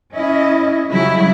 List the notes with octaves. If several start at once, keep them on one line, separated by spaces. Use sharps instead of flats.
C#4 E4 D#5
C#3 F#3 G3 E4